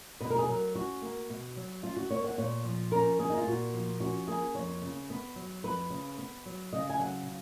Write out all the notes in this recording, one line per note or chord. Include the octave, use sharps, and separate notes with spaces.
B2 B4
A#4
G#4
F#3 A#4
C#4 F#4
A#3
B2
F#3
C#4 F4
F#4
A#3 C#5
F#5
A#2 C#5
F3
C#4 A#4
A#3 G#4
D#4
F4
A#2 F#4
F3
C#4 F#4
A#3 G#4
F2 C#5
C#3
B3
F#3
F2 B4
C#3
B3
F#3
C#3 D#5
G#5
F#3 F#5
C#3